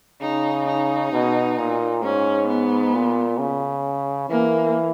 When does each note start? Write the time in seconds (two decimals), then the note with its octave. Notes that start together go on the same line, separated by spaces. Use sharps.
0.21 C#3 D#4
0.67 D#4
1.12 B2
1.57 A#2
2.02 G#2 C#4
2.48 B3
2.94 A#2
3.39 C#3
4.29 E3 A#3